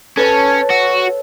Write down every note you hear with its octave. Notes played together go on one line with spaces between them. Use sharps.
C#4 A4 B4 C#5
F#4 E6